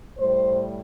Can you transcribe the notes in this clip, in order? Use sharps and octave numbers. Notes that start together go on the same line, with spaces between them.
A2 G3 C5